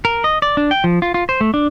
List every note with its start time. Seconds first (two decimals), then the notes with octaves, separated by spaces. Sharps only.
0.05 A#4
0.24 D#5
0.42 D5
0.57 D4
0.71 G5
0.84 F3
1.02 F4
1.14 F4
1.29 C5
1.41 A3
1.54 D4